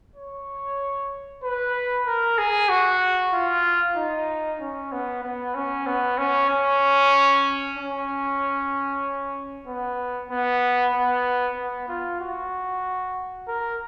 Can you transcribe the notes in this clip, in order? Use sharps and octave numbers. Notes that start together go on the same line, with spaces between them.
C#5
B4
A#4
G#4
F#4
F4
D#4
C#4
B3
B3
C#4
B3
C#4
C#4
C#4
B3
B3
B3
B3
F4
F#4
A#4